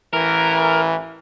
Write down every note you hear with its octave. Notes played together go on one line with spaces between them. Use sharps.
A1 E3 A#4